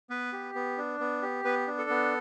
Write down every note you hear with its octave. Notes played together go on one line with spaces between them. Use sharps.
B3 B4
G4
B3
D4
B3
G4
B3 B4
D4
A4
B3